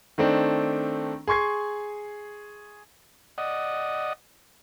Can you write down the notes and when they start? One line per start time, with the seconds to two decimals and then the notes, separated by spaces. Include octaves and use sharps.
0.18 D#3 A3 C4 D4
1.27 G#4 C6 C#6 G#6 C7
3.38 D5 D#5 F#5 D#6